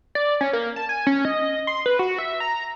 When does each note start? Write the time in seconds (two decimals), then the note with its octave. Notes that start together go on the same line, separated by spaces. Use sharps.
0.15 D5
0.41 C#4
0.53 A#3
0.76 A5
0.89 G#5
1.07 C#4
1.25 D#5
1.67 C6
1.86 B4
1.99 F#4
2.18 E5
2.40 A#5